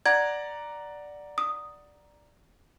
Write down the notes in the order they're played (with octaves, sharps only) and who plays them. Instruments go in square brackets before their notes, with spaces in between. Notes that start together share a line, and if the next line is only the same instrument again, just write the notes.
[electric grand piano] D5 F#5 A#5 [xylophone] G#6
[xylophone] D#6